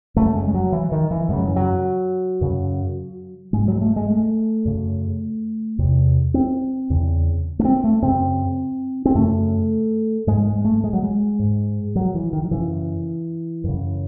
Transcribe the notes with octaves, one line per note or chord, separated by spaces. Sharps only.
F#2 C#3 A3
G#3
G#3
F#3
E3
D#3
E3
F#2 C#3 G#3
F#3
E3
F#3
F#2 C#3
G#2 G#3
F#3
G#3
A3
G#3
A3
F#2 C#3
E2 C3
C4
E2 C#3
A3
C4
A3
F#2 C#3 C4
C4
F#2 C#3 A3
G#2 G#3
G#3
A3
G#3
F#3
G#3
G#2
F#3
E3
D#3
F#3
F#2 C#3 E3
F#2 C#3